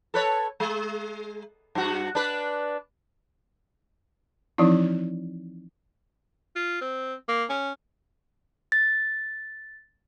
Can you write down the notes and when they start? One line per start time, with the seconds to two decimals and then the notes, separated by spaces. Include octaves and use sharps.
0.14 A4 B4 C#5
0.60 G#3
1.75 G2 F#4
2.15 D4 B4
4.58 E3 F3 C4 D#4 E4
6.56 F4
6.81 C4
7.29 A#3
7.50 C#4
8.72 A6